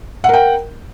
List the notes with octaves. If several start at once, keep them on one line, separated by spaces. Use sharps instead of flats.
A#4 F#5 G5